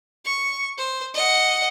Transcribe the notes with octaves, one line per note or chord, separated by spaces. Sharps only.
C#6
C5
D#5 F#5